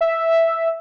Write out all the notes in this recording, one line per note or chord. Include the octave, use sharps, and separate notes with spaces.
E5